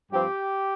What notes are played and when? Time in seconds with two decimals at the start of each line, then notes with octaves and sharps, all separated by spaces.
0.12 G2 F3 C4 G4